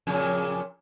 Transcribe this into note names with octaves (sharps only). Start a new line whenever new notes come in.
F2 A#2 C#3